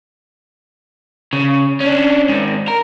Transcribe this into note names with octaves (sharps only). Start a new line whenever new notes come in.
C#3
C#4 D4
G#2 D#3
A#4